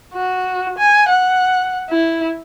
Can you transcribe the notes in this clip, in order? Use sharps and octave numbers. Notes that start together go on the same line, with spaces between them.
F#4
G#5
F#5
E4